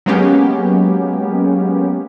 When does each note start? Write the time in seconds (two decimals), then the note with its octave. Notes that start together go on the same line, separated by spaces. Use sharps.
0.06 F#3 G#3 A#3 B3 C#4 G4